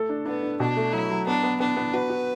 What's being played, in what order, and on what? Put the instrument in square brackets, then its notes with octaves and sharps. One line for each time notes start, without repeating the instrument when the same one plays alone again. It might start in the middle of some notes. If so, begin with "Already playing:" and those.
Already playing: [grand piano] A3 A4
D4
[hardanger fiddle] B3 [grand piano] D4
[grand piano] D4
[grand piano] B2 [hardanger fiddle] D4
[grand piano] A3
[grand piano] F#3 [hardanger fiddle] E4
[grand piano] F#3
[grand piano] B3 [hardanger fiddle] D4
[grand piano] B3
[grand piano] B3 [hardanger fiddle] D4
[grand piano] B3
[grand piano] F#4 [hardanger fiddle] B4
[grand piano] F#4